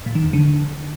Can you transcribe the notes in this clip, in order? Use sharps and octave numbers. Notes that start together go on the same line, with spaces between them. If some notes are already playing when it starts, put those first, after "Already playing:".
A#2
D#3
E2
D3